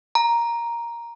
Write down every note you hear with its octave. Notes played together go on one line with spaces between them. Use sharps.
A#5